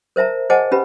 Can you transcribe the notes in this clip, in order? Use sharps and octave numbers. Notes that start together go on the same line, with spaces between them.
A#4 C5 E5 A5 A#5
G#4 C5 D#5 F#5 G#5 A5
C#4 G4 B4 B5